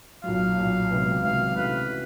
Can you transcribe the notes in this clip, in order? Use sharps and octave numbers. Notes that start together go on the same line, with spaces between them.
B1 A#2 F#3 F5
B1 A#2 F#3
C#2 C3 D#3 F#3 B3
C#2 C3 D#3 F#3 B3 F5
C3 E3 A3 C#4 F#4 B4
F#4